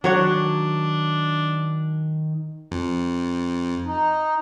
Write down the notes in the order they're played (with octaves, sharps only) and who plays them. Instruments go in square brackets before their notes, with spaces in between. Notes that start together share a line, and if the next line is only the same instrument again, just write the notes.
[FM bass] D#3 [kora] F#3 C#5 F#5 [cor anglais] D4
[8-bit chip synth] F2
[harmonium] D#4